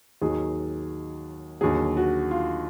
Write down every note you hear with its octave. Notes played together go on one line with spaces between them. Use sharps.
D#2 D#3 F#3 G#4
D#2 D3 F#3 G#4
F#4
F4